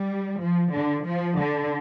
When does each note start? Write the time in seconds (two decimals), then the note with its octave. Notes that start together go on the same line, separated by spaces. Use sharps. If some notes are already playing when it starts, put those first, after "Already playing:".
Already playing: G3
0.40 F3
0.73 D3
1.05 F3
1.38 D3